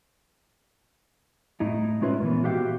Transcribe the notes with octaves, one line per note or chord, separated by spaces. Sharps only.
A2 D#4 E4
G#3 C#4 F4 B4 C#5 E5
A#2 E3 B3
F#4 G4 E5 F5 G5